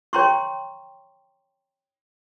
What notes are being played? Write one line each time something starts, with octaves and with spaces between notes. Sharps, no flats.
C#5 G5 A#5 C6 C#6